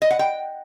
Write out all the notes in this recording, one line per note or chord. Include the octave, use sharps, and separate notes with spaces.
D#5
F#5
G5